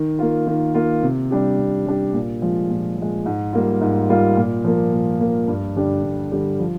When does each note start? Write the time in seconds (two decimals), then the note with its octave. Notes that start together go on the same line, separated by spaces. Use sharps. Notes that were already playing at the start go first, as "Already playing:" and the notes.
Already playing: D#3
0.19 A#3 F4
0.47 D#3
0.75 A#3 F4
1.03 C3
1.31 G3 D4 G4
1.58 C3
1.87 G3 D4 G4
2.14 A#2
2.42 F3 G#3
2.70 A#2
2.97 F3 G#3
3.26 G#2
3.53 G3 A#3 F4
3.81 G#2
4.09 G3 A#3 F4
4.37 A#2
4.64 F3 A#3
4.93 A#2
5.20 F3 A#3
5.48 G2
5.76 D3 G3 D4 G4
6.03 G2
6.32 D3 G3 D4 G4
6.59 F3